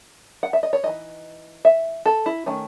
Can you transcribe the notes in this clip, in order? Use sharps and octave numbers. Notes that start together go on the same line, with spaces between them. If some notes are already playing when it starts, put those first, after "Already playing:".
F#5
E5
D#5
C#5
E3 G#3 D#4 D#5
E5
A4
E4
D#3 A3 C#4